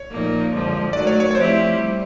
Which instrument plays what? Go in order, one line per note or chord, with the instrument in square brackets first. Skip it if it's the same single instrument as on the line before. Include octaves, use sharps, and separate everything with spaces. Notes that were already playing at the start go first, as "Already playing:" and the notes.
Already playing: [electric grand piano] C#5
[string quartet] A#2 F3 A#3 D#4
F#2 D3 F3 G#3
[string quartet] D#3 F#3 A3 [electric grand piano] D5
[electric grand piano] C#5
C#5
C#5
[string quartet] F3 A3 C4 E4 G4 [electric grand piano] C5
[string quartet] G3